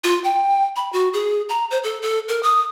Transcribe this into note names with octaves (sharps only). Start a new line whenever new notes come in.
F4
G5
B5
F#4
G#4
A#5
C5
A4
A4
A#4
D#6